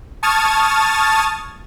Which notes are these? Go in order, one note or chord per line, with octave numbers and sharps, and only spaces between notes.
A5 C#6 D#6 F6 G#6 A6